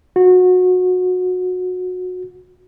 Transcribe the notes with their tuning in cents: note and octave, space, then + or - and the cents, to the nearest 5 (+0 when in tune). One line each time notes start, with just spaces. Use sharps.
F#4 -20